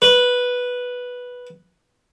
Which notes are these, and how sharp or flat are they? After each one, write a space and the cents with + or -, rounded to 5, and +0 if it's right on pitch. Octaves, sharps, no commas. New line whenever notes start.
B4 -5